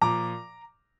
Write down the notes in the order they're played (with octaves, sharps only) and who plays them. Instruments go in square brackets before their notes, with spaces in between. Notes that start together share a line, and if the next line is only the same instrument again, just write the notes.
[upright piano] A#2 F3 A#5 D6